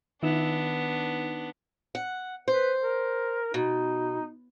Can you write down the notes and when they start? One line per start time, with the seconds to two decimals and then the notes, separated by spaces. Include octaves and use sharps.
0.23 D#3 B3 D4 D#4 E7
1.95 F#5
2.48 B4 C5
2.82 A#4
3.54 B2 D#4